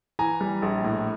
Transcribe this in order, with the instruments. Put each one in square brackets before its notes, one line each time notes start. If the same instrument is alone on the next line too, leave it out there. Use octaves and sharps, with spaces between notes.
[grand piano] E3 G#5 A#5
G3
A#1
A2